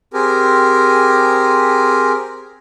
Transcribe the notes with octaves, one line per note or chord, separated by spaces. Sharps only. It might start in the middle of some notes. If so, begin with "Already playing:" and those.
C4 G4 G#4 A#4